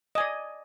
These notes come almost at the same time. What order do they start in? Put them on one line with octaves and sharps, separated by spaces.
D#5 G#5 D5